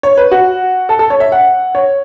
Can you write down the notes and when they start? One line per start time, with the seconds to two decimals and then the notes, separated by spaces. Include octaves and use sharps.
0.03 C#5
0.17 B4
0.31 F#4
0.89 A4
0.99 A4
1.10 C#5
1.20 E5
1.32 F#5
1.75 C#5